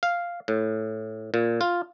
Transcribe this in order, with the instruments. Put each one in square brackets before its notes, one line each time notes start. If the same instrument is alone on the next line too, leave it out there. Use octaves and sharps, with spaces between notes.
[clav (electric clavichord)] F5
A2
A#2
F4